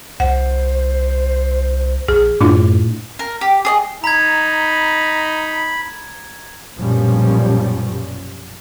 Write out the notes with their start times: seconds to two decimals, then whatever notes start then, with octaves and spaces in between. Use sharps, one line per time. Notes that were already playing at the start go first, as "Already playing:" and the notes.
0.20 C2 C5 F#5
2.08 A#1 G#4
2.41 F#2 A2 D4 E4 F4
3.19 A#4
3.41 G4
3.65 G#4 D5 D#5
4.04 D#4 A#5 B5 G#6
6.79 A#1 F#2 B2 F3 G3 C#4